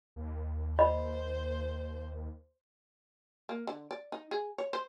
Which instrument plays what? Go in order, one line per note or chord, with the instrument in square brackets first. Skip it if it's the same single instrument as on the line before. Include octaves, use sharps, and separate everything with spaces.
[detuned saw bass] D#2
[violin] C5 [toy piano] D#5 B5
[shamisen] A#3
D3
D5
D#4
G#4
C#5
C5